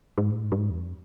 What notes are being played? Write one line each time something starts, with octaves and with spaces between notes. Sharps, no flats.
G#2
A2
G#2
G2
G#2
E2
F2